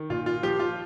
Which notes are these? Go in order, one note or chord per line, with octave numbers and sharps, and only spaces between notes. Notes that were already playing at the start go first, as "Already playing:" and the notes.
Already playing: D#3
A#2 F4
F4
F3 G4
F4